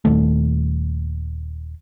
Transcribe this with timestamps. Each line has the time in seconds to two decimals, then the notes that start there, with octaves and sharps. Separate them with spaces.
0.05 D#1 D#3 A3